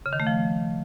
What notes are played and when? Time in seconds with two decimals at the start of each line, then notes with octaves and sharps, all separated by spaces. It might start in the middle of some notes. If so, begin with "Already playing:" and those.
0.06 C#3
0.13 D#3
0.20 A3
0.27 F3